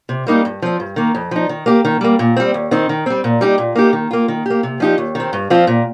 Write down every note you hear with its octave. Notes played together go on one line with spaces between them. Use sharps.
C3
G3 A#3 D#4 G4
G2
F3 C4
G2
D#3 A#3
F2
F3 D#4
D#3
A#3 G4
D#3
G3 A#3
A#2
G3 C4
D#2
D#3 C4 D#4
D#3
G3 C4
A#2
G3 D#4 G4
A#2
A#3 D#4 G4
D#3
A#3 F4
D#3
A#3 G4
C3
F3 D#4 G4
D#2
D#3 C4
G2
F3 C4 F4
A#2